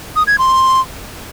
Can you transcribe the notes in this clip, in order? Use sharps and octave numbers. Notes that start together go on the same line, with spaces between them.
D#6
G#6
C6